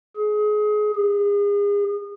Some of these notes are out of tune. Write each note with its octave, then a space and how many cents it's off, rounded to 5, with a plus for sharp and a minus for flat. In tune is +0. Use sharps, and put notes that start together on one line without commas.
G#4 +25
G#4 -35